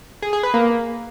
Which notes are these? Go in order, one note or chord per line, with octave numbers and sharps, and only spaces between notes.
G#4
G#4
B4
A#3